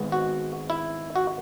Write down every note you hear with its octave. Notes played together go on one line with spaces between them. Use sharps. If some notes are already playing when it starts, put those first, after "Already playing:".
Already playing: G#1 G#2 G#3 B3
F#4
E4
F#4